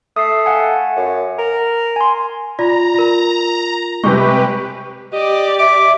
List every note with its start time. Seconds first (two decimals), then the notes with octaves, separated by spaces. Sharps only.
0.16 A3 D#6 C7
0.46 F5 F#5 G#5
0.96 F#2
1.38 A#4
1.96 G#5 C6
2.59 F4 D5 A#5
2.94 F4 A#4
4.04 C3 G3 G#3 G4 B4 C#6
5.13 G4 D5 D#5
5.59 E5 D6